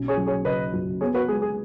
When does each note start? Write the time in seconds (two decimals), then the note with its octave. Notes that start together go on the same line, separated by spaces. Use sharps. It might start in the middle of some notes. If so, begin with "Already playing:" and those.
Already playing: B1 C#4
0.08 G#4 C#5
0.17 F#3
0.27 G#4 C#5
0.45 C#3 B4 D#5
0.73 F#2
1.01 B3 G#4 C#5
1.14 F#4 B4
1.28 G#3 G#4
1.42 G#4